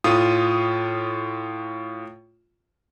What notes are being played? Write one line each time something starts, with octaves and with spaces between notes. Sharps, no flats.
A2 F4 D#6